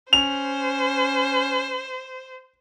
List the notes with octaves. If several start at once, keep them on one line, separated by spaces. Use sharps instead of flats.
C#4 C5 F7